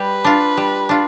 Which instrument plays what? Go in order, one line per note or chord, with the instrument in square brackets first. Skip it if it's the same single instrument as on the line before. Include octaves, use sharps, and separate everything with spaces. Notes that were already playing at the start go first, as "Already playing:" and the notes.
Already playing: [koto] G3 [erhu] B4
[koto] D4 F4
G3
D4 F4